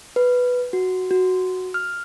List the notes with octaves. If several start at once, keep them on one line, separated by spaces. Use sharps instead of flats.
B4
F#4
F#4
F6